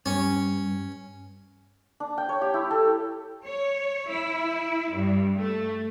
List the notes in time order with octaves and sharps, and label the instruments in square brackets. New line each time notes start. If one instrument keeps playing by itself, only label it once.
[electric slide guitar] G2 [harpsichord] C#4
[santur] D4
G5
C#5
G4
E4
A4
[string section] C#5
E4
G2
A3